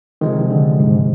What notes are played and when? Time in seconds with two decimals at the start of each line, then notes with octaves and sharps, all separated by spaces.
0.21 C3 D#3 F3 G#3
0.51 D3
0.80 G#2